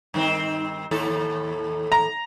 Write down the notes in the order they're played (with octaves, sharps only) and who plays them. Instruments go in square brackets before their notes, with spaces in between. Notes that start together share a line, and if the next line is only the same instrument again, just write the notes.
[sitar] G2 D#3 C4
D#2 A2 A4
[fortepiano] A#5